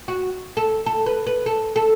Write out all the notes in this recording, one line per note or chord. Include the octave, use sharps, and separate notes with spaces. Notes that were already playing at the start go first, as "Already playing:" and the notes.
F#4
A4
A4
B4
B4
A4
A4